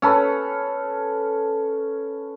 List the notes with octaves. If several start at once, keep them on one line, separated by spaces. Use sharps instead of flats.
C#4 A4 B4